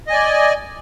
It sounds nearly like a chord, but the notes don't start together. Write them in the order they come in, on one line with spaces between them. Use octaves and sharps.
D#5 G#5 D5